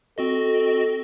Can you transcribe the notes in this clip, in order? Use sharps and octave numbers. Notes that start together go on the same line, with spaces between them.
C4 F#4 A4 D#5